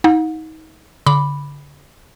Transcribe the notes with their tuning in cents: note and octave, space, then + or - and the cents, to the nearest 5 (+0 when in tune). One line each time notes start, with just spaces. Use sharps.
D#4 +30 F#5 -40
D3 -35 B5 +0 D6 +0